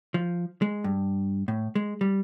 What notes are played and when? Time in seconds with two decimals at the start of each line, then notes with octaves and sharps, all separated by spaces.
0.14 F3
0.62 G#3
0.84 G2
1.48 A2
1.76 G#3
2.01 G3